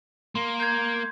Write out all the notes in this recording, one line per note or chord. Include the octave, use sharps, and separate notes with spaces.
A#3 C6
G6 G#6